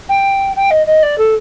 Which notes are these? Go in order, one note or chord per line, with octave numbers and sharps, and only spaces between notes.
G5
G5
D#5
D#5
D5
A4